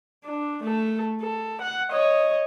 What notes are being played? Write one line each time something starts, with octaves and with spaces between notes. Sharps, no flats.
D4
A3 A4
A4
F#5
C#5 D#5